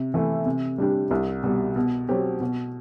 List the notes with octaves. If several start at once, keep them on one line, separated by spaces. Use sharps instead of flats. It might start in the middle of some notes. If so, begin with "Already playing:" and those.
Already playing: C3
E3 A3 E4
C3
G3 D4 G4
C2
B2 G3
B2
F#3 C4 G4
B2